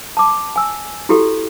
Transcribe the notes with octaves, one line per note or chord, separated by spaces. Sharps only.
A5 D6
G#5 E6
E4 F#4 G4 A4